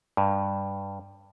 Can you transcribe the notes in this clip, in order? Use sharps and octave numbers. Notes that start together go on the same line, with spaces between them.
G2